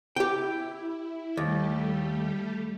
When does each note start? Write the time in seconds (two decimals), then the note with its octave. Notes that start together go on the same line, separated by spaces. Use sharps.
0.16 E4 G4 G5
1.37 D#2 G3 A3 G4